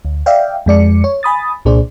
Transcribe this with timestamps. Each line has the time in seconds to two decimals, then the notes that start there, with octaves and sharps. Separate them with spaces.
0.05 D2
0.26 D5 E5 F5 G5
0.66 F2 G#3 D5 C#7
1.04 C#5
1.23 G#5 B5 D#6 A6
1.65 C2 A#2 D4 G#4 C5 D5